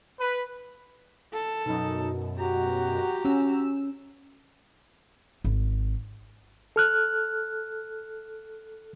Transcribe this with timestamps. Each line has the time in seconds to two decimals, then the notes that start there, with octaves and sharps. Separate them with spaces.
0.20 B4
1.32 A4
1.66 F#2 B2 D#4
2.38 F#4 G4 A#5
3.25 C#4 E6
5.44 G#1
6.76 A4 F6 F#6